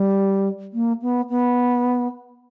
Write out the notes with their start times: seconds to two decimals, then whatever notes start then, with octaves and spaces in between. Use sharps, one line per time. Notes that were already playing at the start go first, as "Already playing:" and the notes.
Already playing: G3
0.73 A#3
1.02 B3
1.30 B3